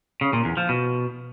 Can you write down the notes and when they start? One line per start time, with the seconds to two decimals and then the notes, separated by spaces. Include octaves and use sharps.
0.21 C#3
0.33 A#2
0.45 E2
0.57 F3
0.69 B2